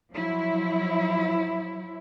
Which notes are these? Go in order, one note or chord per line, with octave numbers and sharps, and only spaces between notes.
F3 F#3 E4